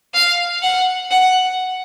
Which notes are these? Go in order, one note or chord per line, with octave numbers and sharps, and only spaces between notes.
F5
F#5
F#5